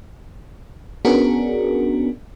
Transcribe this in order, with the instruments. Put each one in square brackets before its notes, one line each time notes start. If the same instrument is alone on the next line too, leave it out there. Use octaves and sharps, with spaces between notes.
[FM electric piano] B3 C#4 D4 F#4 G#4 A#4